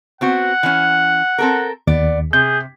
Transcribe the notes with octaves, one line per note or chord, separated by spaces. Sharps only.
B3 C4 F#4 F#5
E3 C#4
C4 A4 A#4
D#2 B3 D5
C3 G#4 G6